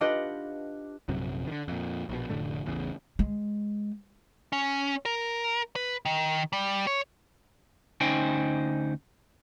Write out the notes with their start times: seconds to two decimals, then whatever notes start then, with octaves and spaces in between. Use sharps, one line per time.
0.01 D4 F4 G4 B4 D#5 F#5
1.08 A#1 F#2 C3 F#3
1.47 D3 D#3
1.68 F2 A#2
2.09 A#1 B2
2.30 F1 A2 D3 A3
2.66 A1 E2 C#3
3.19 G#3
4.53 C#4
5.05 A#4
5.76 B4
6.05 D#3
6.53 G3
6.87 C#5
8.01 D2 C#4 D#4 C5 G5 G#5